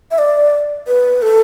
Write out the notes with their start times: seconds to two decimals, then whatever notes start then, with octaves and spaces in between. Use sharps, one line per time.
0.11 E5
0.18 D5
0.87 B4
1.22 A4